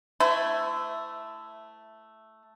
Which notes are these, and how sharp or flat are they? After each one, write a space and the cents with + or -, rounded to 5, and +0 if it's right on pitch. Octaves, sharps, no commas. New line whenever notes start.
A3 +0 E4 +10 C5 -45